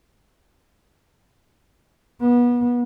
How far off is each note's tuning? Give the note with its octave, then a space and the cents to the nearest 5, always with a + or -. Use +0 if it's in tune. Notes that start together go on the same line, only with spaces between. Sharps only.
B3 -30